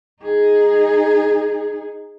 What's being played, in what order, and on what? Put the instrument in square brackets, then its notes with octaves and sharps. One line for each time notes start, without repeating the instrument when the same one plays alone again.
[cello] D#4 G#4